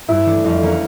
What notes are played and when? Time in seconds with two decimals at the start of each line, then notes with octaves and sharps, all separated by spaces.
0.09 G2 E4
0.26 E3 A3 D4
0.45 F2 E4
0.63 E3 A#3 C#4